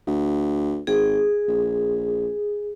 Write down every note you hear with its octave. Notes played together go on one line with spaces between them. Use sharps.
D2
G#1 G#4
A#1